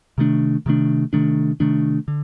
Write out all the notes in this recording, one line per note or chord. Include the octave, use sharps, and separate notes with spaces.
C3 D#3 A3 D4
C3 D#3 A3 D4
C3 D#3 A3 D4
C3 D#3 A3 D4
D3